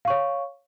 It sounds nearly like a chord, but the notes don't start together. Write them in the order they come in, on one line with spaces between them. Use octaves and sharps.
F5 C#6 C#5